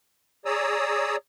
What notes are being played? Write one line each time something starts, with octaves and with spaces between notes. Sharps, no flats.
G#4 C#5 D5 A#5 D#6 E6